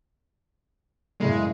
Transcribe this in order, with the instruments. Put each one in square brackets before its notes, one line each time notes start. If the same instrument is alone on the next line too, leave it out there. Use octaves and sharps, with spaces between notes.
[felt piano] F#2 A2 C#3 [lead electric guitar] G#3